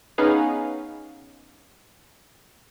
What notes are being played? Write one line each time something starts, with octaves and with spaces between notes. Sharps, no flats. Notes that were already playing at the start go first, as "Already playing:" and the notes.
B3 C#4 D#4 G#4 B4 F5